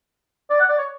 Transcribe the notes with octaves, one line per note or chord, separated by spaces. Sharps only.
D5
F#5
D5
C#5